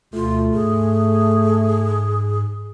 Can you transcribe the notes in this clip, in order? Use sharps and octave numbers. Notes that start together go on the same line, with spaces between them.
D2 B2 A3 F4
G#2 G#4